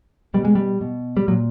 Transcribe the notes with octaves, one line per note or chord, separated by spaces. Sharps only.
B2 G3
G#3
G3
B2
G3
A#2 F#3